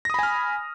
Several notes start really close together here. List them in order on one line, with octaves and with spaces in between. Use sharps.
A#6 D#6 B5 G#5 F6